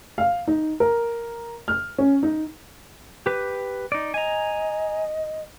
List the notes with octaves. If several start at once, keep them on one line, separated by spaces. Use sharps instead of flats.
F5
D#4
A#4
F6
C#4
D#4
G4 B4
D#4 D5
D#5 G#5 A#5